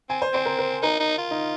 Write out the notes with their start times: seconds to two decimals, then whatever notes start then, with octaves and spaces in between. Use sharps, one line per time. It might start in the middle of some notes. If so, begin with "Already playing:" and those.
0.09 C4 G#5
0.22 C5
0.33 C4 C5
0.46 A#4
0.59 A#4
0.82 D#4 A#4
1.00 D#4
1.18 F4
1.31 D#4